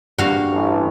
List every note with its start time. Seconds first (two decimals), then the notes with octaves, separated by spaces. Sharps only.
0.18 G2 G3 A#3 F#4 F5
0.52 A1